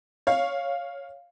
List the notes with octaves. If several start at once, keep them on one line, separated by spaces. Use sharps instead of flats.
C#5 F5